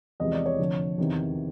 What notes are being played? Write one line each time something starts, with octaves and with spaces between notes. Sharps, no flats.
E2 C3 F3 G#3 D#5
D5
C#5
F1 F2 D3
E2 C3 D#3